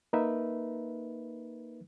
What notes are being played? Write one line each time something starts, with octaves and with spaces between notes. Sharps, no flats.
A#3 D#4 A#4 B4 E5